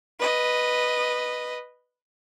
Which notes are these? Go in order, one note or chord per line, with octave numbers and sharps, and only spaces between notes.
B4 D#5